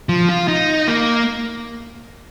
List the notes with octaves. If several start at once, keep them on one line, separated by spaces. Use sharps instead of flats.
F3
F4
D#4
A#3